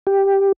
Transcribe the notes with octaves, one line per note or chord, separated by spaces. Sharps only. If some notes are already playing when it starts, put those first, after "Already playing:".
G4